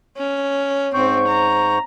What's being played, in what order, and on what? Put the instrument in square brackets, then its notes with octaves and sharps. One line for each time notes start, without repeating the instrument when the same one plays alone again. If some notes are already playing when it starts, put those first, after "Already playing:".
[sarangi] C#4
[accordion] G#2 C#6 G6 [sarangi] C4
[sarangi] A#5